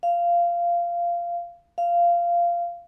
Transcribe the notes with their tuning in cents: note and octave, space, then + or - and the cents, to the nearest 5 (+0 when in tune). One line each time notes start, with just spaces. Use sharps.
F5 -15
F5 -15